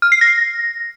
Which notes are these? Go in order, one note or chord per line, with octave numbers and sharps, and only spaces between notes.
F6
C7
A#6